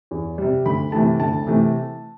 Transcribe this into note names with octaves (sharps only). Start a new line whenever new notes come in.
E2
C3 G3
D2 B5
C3 E3 A3 A5
D2 A5
C3 E3 A3